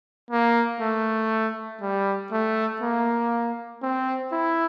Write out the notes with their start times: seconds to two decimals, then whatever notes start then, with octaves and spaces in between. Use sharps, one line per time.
0.30 A#3
0.81 A3
1.81 G3
2.32 A3
2.81 A#3
3.82 C4
4.32 E4